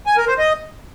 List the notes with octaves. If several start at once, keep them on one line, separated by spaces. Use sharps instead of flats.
G#5
A#4
C5
D#5